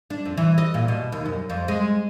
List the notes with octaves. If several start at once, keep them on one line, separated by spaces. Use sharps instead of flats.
D4
F2
E3
D#5
A#2
B2
D#2
F#2
F2
G#3